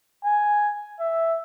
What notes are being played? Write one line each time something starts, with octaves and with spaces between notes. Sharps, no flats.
G#5
E5